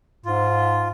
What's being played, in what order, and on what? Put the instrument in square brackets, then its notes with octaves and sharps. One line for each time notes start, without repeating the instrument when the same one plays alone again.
[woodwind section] G#2 [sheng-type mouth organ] F4